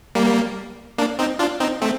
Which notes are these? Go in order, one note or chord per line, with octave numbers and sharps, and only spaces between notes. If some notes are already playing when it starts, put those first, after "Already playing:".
G3 A#3
A#3 D4
C4 D#4
D4 F4
C4 D#4
A3 C4